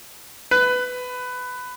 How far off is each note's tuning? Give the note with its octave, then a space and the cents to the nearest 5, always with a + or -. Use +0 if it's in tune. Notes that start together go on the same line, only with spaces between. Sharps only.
B4 +15